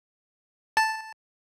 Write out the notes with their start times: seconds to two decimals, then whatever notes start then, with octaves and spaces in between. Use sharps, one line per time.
0.77 A5